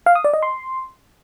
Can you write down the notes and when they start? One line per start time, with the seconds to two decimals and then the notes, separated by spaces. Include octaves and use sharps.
0.06 F5
0.15 D#6
0.24 D5
0.33 D#5
0.43 C6